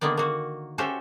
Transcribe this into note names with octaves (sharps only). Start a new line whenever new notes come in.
D3 D#3 A#3 B3 D5
A#3 F#4
C#4 F#4 G4 A4 C5 E5